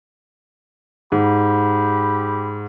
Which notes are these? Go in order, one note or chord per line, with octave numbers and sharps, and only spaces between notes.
G#2 G4 B5